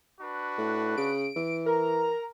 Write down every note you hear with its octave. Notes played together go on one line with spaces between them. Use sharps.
D4 F#4 B4
A2
C#3 D7
E3
A#4 A#5